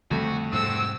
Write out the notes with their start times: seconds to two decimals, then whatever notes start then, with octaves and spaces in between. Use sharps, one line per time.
0.11 F2 D3 G3 A3 C4 F#4
0.53 G#2 C3 G3 C4 F#4 E6